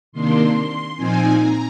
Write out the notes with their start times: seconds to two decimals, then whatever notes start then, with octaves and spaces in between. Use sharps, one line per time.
0.12 C3 D#3 A#3 D4 C6
0.95 A#2 F3 C4 D#4 G#5
1.37 A#5